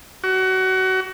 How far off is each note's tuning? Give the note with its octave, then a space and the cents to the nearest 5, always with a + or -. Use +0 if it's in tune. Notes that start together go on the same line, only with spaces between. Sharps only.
F#4 +25